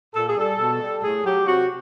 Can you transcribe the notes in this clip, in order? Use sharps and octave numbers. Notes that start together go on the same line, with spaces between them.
A#2 A4
G#4
G3 A4
B2
G3
A2 G#4
F#3 G4
C3 F#4